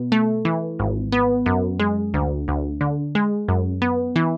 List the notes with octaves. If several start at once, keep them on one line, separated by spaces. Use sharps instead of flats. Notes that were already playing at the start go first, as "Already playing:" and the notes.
Already playing: B2
A3
E3
G#1
B3
F#2
G#3
D2
D2
D3
G#3
F#2
B3
E3